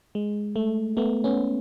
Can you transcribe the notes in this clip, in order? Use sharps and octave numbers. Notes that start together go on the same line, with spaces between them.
G#3
A3
A3 B3
B3 C#4